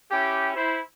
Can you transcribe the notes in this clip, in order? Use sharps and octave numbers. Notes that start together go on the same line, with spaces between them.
C#4 E4 G4
E4 C5